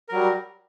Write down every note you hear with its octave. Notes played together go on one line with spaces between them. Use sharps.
F#3 G3 A#4